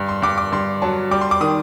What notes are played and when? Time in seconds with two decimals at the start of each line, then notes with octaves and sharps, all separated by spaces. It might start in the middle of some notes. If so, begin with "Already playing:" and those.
Already playing: G2
0.09 C6
0.22 G2 D6
0.38 D6
0.52 G2 C6
0.82 F#3 A5
1.11 G3 D6
1.21 C6
1.31 D6
1.41 D#3 D#6